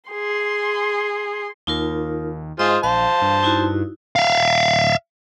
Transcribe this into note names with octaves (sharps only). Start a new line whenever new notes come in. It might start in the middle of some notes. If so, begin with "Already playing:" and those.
G#4 C6
D#2 D#4 F4 A#4
G#2 F4 G#4 C5 D#5 G#5
A#1 C5 F5 A5
G2
D#4 E4 F#4
E5 F5